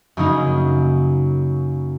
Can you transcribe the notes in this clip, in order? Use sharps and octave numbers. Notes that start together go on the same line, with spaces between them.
F#2 C#3 F#3 A#3 D#4